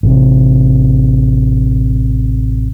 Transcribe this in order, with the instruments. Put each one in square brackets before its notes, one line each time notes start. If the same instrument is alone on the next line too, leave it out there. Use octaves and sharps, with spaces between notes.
[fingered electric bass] A1 C3